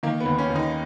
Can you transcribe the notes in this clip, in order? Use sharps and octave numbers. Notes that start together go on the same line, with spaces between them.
D#3 A#3
B3
D#2
C#4
D#2
D#4